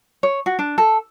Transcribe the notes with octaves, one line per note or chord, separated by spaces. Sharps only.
C#5
F#4
D4
A4